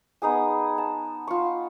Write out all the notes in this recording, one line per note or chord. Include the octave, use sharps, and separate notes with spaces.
B3 D#4 G#4 G#5
A5
F4 C#6